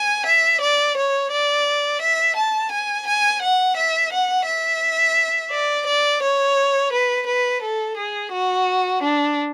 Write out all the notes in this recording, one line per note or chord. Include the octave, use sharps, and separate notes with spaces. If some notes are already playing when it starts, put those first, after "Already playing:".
Already playing: G#5
E5
D5
C#5
D5
E5
A5
G#5
G#5
F#5
E5
F#5
E5
D5
D5
C#5
B4
B4
A4
G#4
F#4
D4